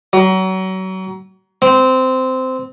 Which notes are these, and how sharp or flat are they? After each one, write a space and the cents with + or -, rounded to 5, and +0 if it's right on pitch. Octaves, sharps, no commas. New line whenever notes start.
F#3 +30
C4 -15